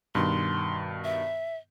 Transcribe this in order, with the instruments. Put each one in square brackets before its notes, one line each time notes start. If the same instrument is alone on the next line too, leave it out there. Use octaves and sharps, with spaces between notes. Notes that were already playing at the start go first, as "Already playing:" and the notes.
[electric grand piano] G2 B2 D#3 [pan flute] C6
[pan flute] E5